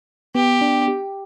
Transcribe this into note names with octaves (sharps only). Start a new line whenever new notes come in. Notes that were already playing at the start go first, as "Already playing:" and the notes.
B3 G4
D4
G4